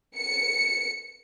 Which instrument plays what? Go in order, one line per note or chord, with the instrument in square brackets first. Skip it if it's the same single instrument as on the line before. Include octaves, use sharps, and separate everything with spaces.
[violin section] C#7